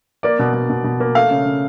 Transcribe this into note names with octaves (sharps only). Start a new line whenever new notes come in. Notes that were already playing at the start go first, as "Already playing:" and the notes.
A#3 D5
B2
B2
B2
B2
A#3
A3 F5
C#3
C#3